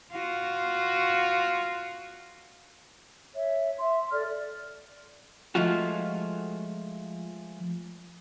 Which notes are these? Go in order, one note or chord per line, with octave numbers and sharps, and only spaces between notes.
F4 F#4
C#5 E5
E5 C6
A4 D5 F6
F3 G#3 A3 F4 F#4